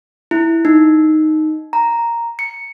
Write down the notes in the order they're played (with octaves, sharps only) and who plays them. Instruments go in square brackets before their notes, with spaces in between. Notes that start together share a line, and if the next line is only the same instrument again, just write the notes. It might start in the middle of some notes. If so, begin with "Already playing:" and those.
[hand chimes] E4
D#4
A#5
C#7